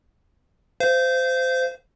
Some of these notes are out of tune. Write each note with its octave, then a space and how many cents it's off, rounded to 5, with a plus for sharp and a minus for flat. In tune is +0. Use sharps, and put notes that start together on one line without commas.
C5 -20 F5 -30